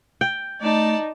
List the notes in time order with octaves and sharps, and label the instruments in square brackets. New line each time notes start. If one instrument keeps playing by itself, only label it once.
[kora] G5
[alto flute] A3 [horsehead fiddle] D#4 [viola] D5 A5